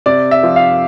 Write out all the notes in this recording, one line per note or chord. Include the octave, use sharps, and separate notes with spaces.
C3 D5
E5
F3
F5